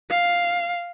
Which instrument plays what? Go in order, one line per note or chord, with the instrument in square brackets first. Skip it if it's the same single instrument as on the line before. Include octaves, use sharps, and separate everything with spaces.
[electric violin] F5